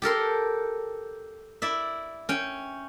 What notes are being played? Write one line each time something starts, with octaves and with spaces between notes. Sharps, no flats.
G4 A4 A#4 C6
E4 D5 E5
C#4 G5